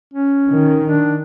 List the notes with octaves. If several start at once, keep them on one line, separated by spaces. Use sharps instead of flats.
C#4
D#3
D4